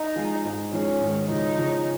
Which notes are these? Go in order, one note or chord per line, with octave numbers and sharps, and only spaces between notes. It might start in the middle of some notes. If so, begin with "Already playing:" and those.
Already playing: D#4
F3 G#3 F4 G#4
G#2 G#3 D#4 G#4
F3 G#3 C#4 D#4 G#4
G#2 D#3 G#3
C#3 F3 G#3 D#4
C#3 F3 G#3 C#4